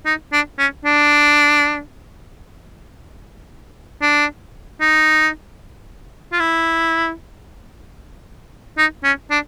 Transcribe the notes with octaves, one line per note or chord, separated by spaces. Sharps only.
D#4
D4
C#4
D4
D4
D#4
F4
E4
D#4
C#4
D4